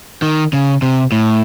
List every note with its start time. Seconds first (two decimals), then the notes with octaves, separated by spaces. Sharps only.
0.22 D#3
0.53 C#3
0.82 C3
1.12 A2